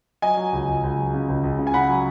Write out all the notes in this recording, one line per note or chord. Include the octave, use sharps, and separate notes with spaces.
F#3 D#5 G#5
F#3
C#2
C#2
C#2
F#3
C#3
C#2
C#2
C#3
G#5
C#3 F#5 B5
F#3